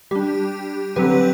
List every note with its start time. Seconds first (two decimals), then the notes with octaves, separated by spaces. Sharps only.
0.11 G3 D4 G4
0.96 D3 F#3 C4 G4 B4